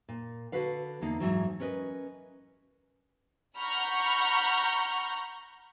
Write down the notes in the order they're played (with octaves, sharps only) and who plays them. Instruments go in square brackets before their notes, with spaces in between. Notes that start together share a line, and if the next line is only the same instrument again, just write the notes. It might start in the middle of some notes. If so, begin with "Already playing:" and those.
[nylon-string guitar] A#2
D3 F#4 A4 B4 F5
E2 D3 A#3 D#4
G#2 C3 E3 F#3
C#4 A#4 B4 D5 D#5
[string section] F#5 A#5 B5 C#6 F6 G6